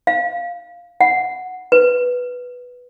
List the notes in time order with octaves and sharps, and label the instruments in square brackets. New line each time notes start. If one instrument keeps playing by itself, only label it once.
[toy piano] F5
F#5
B4